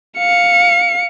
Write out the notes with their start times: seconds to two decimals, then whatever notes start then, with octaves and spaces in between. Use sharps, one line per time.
0.18 F5 C#7